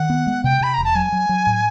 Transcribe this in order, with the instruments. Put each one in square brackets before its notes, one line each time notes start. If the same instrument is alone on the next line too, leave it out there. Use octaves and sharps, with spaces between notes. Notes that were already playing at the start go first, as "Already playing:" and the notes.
Already playing: [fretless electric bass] D#3 [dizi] F#5
[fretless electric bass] B3
G#3
[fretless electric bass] C3 [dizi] G5
[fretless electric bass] C3 [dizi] B5
[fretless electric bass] E1 [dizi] A#5
[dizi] A5
[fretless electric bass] F#3 [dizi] G#5
[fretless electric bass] F#3
F#3
A2